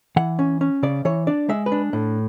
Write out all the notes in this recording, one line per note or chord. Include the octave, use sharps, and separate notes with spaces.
E3 F#5
C#4
C#4
C#3 D5
E3 C#5
D4 D5
G#3 E5
B4
D4
A2